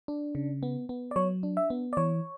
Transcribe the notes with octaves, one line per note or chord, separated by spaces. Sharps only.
D4
C#3
B3
B3
D5
F#3 C#5
D4
E5
B3
D5
E3 C#5